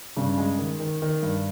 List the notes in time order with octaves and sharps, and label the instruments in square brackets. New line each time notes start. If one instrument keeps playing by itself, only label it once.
[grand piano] G2 [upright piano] C#3
[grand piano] G#3
D#3
D#3
D#3
G2